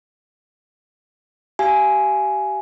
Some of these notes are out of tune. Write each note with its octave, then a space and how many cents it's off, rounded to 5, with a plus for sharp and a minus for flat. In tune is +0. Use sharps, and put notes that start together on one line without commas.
G4 -30 F5 -30 G#5 +10